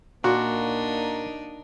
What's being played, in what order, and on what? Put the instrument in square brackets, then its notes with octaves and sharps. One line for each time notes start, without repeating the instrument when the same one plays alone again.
[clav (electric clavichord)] A#2 [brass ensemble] A#3 [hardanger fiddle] D4 D#4 [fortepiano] F#4